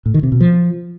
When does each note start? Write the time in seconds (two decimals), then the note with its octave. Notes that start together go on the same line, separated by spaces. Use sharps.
0.06 A2
0.14 D#3
0.23 C3
0.32 B2
0.41 F3